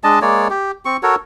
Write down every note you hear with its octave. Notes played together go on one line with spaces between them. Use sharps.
G#3 D4 D#5 A5
G#3 A#3 C#5 D5
G4
C4 C#6
F#4 A4 A#4 C#5